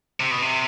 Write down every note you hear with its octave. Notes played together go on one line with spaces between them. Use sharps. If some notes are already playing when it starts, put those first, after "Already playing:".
C3
B2
C3